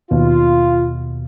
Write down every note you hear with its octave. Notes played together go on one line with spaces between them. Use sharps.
D#2 B2 F4